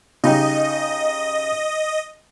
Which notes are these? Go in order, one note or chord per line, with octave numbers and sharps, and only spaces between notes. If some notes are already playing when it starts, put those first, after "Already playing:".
C#3 D#4 G4 D#5